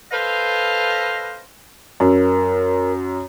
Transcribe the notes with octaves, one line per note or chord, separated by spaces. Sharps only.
A4 B4 C5 D#5 F5
F#2 A#4